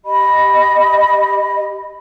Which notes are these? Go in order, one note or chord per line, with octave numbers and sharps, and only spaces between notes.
G4 D#5 B5